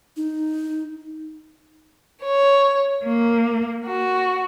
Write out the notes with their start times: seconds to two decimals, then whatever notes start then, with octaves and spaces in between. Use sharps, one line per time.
0.17 D#4
2.23 C#5
3.05 A#3
3.86 F#4